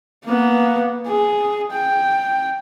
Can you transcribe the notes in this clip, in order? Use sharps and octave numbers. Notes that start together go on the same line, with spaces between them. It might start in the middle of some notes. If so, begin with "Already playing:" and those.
A#3 B3
G#4
G5